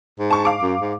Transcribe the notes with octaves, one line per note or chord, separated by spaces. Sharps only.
G#2
A5 C#6
F5 D6
F#2
G#2